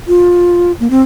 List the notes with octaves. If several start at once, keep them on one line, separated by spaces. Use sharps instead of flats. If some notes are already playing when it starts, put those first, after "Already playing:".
F4
A#3
C4